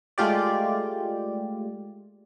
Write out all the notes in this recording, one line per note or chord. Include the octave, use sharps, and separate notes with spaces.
G#3 A3 F4 G4 D5